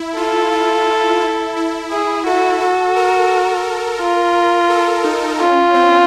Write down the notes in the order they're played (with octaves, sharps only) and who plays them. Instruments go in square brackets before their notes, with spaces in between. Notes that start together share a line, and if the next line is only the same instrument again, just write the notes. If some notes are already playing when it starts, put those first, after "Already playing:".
Already playing: [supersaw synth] E4
[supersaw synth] F4 [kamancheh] A4
[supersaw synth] F4
E4
E4
[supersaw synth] E4 [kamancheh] G#4
[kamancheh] F#4 [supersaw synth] A4
[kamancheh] F#4 [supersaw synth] A4
[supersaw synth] A#4
[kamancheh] F4
[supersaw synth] A4
D#4
[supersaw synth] C#4 [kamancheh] F4
[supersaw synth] C4